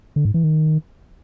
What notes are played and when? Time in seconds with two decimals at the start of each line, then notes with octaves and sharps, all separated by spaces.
0.16 D3
0.25 G#2
0.34 E3
0.43 D#3